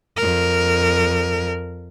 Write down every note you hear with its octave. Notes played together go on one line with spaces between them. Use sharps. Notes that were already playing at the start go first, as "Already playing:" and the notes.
F2 A#4